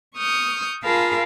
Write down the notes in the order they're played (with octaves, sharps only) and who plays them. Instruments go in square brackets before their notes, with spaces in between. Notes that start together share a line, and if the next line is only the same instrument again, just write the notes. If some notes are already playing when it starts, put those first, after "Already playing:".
[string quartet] C#6 D#6 F6 G6
F4 G#4 A#4 F5 A5 B5